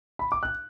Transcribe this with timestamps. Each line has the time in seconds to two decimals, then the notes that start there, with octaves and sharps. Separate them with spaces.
0.19 B5
0.32 D6
0.43 F#6